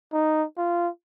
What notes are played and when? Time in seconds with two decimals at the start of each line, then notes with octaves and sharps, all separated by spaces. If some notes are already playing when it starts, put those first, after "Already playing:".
0.13 D#4
0.57 F4